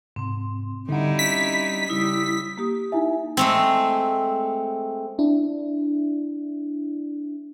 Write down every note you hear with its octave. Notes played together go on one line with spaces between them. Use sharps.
G#2 C3 C4 C6
D3 G3 D#4 E4 F#5
C#4 B6
C#3 G3 E4 D#6
A#3 G4 D#6
D#4 E4 E5 G#5
G#3 A3 C4
D4 E4